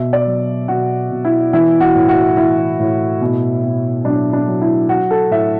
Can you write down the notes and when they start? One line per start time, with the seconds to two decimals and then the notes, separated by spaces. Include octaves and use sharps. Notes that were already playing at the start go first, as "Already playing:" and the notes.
Already playing: B2 E5
0.13 D5
0.27 F#3
0.68 B2 F#4
1.11 B2
1.25 E4
1.53 E3 E4
1.81 F#4
1.95 A2
2.09 F#4
2.37 E3 E4
2.79 A2
3.21 B2
3.63 B2
4.05 F#3 D4
4.33 D4
4.48 F#3
4.61 E4
4.89 F#3 F#4
5.11 A4
5.31 A2 E5